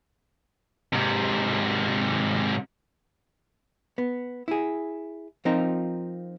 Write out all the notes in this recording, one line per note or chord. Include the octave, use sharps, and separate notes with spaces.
G#2 C3
B3
E4 G#4
F3 C4 D#4 F4 A#4